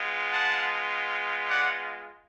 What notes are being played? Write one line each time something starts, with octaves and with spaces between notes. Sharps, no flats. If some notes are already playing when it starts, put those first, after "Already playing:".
Already playing: G#3 B3 F4
F#5 A5
D5 F#5